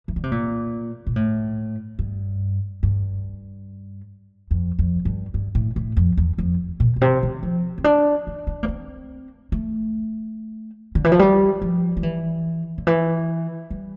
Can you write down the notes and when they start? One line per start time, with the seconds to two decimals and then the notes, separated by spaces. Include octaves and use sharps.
0.08 E3
0.16 D3
0.23 C3
0.32 A#2
1.07 A#2
1.16 A2
1.99 G2
2.83 G2
4.51 F2
4.79 F2
5.05 G2
5.34 G2
5.55 A2
5.76 A2
5.97 F2
6.17 E2
6.38 F2
6.80 A#2
6.96 A#2
7.01 C3
7.23 D3
7.43 F3
7.78 C4
7.84 D4
8.27 D4
8.47 D4
8.63 A#3
8.68 C4
9.52 A3
10.95 D3
11.04 E3
11.12 F3
11.19 G3
11.62 F3
11.97 F3
12.03 E3
12.78 D3
12.87 E3
13.70 G3